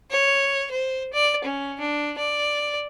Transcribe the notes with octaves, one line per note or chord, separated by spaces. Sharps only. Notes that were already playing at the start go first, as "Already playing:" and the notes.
C#5
C5
D5
C#4
D4
D5